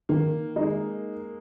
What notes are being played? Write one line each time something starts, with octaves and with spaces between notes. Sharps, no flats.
D#3 A#3
G#3 D#4